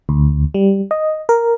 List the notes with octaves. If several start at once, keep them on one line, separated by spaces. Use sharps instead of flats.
D2
G3
D#5
A#4